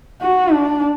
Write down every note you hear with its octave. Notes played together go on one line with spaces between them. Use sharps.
F#4
D4